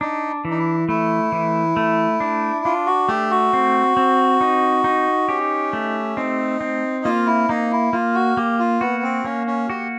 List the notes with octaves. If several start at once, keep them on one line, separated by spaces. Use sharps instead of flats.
D4 D#4
E3
D#4
E4
A3 E4
E3
A3
D4
D4 F4
F#4
A3 G4
F#4
C4
C4
D#4
D#4
C#4 G4
A3
C4 D#4
C4
A#3 F4
E4
A#3 D#4
E4
A#3 F4
F#4
A#3 G4
F4
B3 F#4
C4
A#3 C#4
C#4
F#4 G4